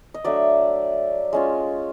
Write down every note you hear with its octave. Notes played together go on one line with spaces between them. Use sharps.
D#5
F#3 A3 D4 D5 E5
G#3 C#4 F4